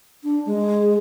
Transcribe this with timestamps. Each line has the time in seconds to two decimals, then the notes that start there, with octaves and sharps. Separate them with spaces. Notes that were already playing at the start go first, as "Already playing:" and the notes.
0.24 D4
0.46 G#3